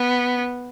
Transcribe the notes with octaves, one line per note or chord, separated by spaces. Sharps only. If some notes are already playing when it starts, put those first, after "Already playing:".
Already playing: B3